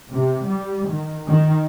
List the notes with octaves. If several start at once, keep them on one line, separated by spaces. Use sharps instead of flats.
C3
G3
D#3
D#3